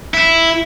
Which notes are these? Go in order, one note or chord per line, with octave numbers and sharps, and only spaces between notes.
E4